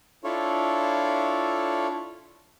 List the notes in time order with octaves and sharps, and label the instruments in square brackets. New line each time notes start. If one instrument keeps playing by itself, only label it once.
[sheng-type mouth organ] D4 E4 F4 A4 C#5